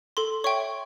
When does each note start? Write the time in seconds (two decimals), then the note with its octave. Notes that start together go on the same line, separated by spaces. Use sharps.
0.17 A4 C6
0.44 C#5 E5 G5 C#6